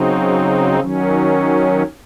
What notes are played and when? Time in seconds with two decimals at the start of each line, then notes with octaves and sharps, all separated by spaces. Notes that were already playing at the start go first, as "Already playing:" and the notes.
Already playing: C#3 F#3 C4 D#4
0.79 D#3 F#3 C#4